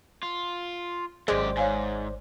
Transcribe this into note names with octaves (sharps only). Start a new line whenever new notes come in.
F4
G#1 F#2 G#3 G4 C5 D5
G#2 C#5 F5 G#5